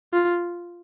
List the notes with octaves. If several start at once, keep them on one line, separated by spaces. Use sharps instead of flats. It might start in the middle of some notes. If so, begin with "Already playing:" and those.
F4